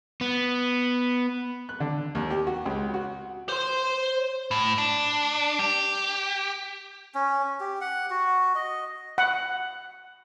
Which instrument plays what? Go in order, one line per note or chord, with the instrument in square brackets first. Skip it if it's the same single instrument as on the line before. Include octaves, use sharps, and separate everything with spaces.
[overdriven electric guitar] B3
[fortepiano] F#6
D3
D#2
G4
F#4
C#2
F#4
[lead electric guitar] C5 C6
A2
D4
G4
[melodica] C#4
G4
F#5
F#4
D#5
[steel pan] F#5